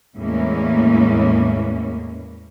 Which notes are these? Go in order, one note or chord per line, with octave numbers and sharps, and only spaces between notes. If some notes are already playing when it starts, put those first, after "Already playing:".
E2 A2 E3 G#3 A#3 C#4